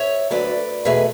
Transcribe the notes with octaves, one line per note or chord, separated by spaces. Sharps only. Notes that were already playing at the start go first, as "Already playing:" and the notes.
Already playing: C#5 E5
D2 D3 F#3 B4 D5
E2 B2 A3 G#4 B4